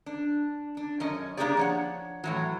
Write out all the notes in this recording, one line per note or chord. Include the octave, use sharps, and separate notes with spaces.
D4
D4
F#2 C#4 D#5
A#3 D4 D#4 G4 G#4 D5
F3 C#5 F#5
A2 E3 F#3